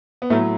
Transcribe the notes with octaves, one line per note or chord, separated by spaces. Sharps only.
B3
A2 F#3 A3